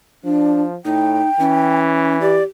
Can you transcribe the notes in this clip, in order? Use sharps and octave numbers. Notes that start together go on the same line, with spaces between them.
F3 D4
A2 D#4 G5
E3 C#4
G4 D5